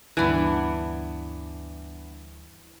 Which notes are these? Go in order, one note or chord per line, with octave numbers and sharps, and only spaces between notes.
D2 G2 E3 B3 D4